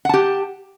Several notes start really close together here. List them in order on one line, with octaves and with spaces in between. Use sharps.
F#5 A5 G4